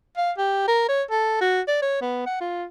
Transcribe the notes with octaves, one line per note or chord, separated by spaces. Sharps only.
F5
G4
A#4
C#5
A4
F#4
D5
C#5
B3
F#5
F4